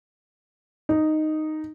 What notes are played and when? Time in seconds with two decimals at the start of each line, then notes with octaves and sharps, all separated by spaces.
0.89 D#4